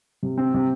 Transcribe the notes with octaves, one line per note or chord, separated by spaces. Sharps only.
C3
C4
C3